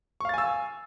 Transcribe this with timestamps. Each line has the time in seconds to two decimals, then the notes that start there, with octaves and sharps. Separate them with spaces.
0.21 C#6
0.25 F5
0.29 A6
0.34 G#5
0.38 E6